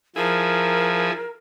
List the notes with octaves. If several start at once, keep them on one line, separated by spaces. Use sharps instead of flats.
F3 E4 G#4 A#4